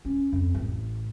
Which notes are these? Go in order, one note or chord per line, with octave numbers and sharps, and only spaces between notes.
C#4
F2
A1